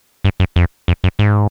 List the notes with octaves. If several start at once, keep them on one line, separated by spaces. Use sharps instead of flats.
G2
F#2
F2
F2
F#2
G#2